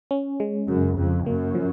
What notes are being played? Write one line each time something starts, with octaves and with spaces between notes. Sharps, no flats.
C#4
G#3
F#2 C#3
F2 C#3
F#2 A#3
F3